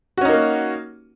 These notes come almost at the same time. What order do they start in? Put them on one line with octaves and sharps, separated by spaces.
F#4 C#4 D#4 A#3